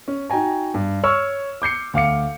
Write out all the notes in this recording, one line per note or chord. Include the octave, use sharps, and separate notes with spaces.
C#4
D#4 F#4 G5 G#5 A#5
G2
C#5 C#6 E6 F6
D6 G6 C7 C#7
D2 F5 D6 C#7